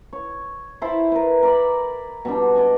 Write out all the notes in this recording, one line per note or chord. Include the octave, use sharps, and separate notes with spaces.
C#5
E4 C5 A5 B5
A#4 B4
A#4 D5 B5
B2 G3 D4
D5 D#5 G#5